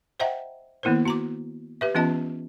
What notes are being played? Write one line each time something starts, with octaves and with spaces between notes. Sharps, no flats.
C5 D#5 E5 F#5 G5 A#5
D#3 A#3 B3 E4 A#4 C5
F#4 A#5 D6
G4 B4 E5
E3 B3 C#4 F4 D#5 A5